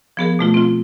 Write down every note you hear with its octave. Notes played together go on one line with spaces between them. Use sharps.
F3 B3 G#4 A#4
B2 A3 F4
C4 F4